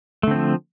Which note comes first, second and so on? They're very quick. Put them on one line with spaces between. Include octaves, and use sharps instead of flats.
A3 D3 C4 F3